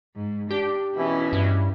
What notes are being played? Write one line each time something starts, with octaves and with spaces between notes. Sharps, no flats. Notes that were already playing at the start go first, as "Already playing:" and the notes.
G#2
D4 G4
G#1 B2 E3 C#4 E4
G2